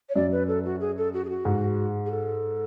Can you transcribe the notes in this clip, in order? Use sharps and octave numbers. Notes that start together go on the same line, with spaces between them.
C#5
F#2 D5
B4
A4
F#4
G#4
A4
F#4
G#4
F#4
G#2
G#4
A4